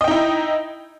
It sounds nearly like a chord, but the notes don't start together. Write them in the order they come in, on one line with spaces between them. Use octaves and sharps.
D#5 G5 D#4 E4